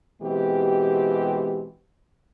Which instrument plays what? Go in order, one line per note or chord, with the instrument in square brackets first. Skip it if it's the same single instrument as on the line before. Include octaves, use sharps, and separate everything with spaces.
[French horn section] B2 E3 G#3 C4 G4